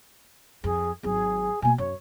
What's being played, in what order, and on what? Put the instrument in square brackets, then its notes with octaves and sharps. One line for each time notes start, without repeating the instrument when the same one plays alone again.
[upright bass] F2 [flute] G#4
[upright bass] G#1 F#3 [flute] G#4
[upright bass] B2 A#3 [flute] G#5
[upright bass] F#2 [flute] C#5